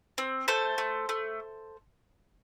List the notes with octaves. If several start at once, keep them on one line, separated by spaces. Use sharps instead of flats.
C4
A3 A4 C5
A3
A3